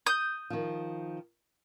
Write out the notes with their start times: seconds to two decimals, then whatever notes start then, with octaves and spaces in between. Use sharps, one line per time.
0.06 D#6 G6
0.50 D#3 F3